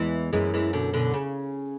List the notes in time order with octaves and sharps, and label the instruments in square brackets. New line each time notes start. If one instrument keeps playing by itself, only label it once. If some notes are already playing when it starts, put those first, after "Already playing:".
Already playing: [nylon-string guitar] E2 [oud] E3 G#3
[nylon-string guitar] F#2 [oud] E3 G#3
[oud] E3 G#3
B2 D3
B2 D3
C#3